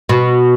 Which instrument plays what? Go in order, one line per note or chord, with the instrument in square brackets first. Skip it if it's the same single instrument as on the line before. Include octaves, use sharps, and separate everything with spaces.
[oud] B2